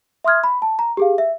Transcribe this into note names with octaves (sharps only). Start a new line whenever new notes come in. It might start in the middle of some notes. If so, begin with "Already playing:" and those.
E5 C6 D#6 F6 G#6
B5
A5
A#5
G4 G#4 F5
E5